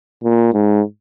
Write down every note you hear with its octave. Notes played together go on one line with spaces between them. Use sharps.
A#2
G#2